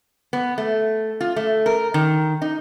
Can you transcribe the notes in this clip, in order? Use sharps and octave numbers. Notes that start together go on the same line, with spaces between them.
B3
A3
F4
A3
A#4
D#3
D#4